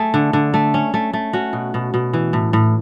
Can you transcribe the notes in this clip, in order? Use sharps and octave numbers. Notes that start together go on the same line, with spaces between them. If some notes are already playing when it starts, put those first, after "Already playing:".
Already playing: A3 G#4
D3
D3
A3
C#4
A3
A3
C#4 F#4
B2
B2
B2
E3
A2
A2